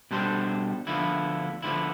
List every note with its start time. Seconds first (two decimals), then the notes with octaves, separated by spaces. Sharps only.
0.11 B2 G3 D4 A4 C5
0.87 D2 D3 F3 B3 E4
1.62 D2 D3 F3 B3 E4